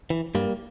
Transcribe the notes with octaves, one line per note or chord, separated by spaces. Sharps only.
E3
G2 G3 A#3